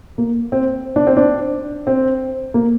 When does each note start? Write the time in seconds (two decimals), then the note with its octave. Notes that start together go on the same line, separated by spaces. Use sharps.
0.18 A#3
0.52 C4
0.96 D4
1.07 C4
1.17 D4
1.87 C4
2.54 A#3